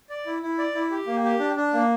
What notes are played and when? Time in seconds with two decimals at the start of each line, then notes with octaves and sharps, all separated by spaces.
0.10 D5
0.26 E4
0.42 E4
0.59 D5
0.75 E4
0.91 G4
1.07 A#3
1.24 G4
1.39 D4
1.56 D4
1.73 A#3